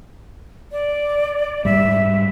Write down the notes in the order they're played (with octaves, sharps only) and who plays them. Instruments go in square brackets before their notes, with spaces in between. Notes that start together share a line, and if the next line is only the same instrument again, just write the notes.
[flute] D5
[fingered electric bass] G#2 G3 [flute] E5